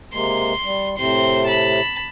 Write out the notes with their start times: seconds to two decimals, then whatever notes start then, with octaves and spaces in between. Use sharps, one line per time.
0.13 C3 G#3 A#3 C6
0.64 G3
0.98 A2 C3 C4 C6
1.46 A5 B5